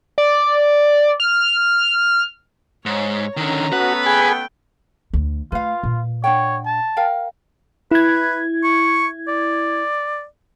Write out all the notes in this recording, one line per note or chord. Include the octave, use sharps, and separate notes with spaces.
D5
F6
G#2 C#5
D3 D#3 C#4 A#5
A3 B3 F#4 B4
G#4 G5 G#5 B5
D2
A3 F4 B4 F5
A#2
D4 C#5 F#5 G5
A5
A#4 F5 G5
E4 B4 G#6
C#6
D5